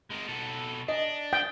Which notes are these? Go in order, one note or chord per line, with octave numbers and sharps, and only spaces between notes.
G#3 A#4
B2 A4
D4 D#5
G5